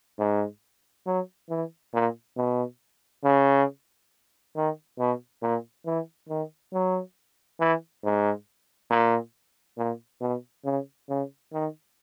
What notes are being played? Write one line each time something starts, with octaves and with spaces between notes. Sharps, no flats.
G#2
F#3
E3
A#2
B2
C#3
D#3
B2
A#2
E3
D#3
F#3
E3
G#2
A#2
A#2
B2
C#3
C#3
D#3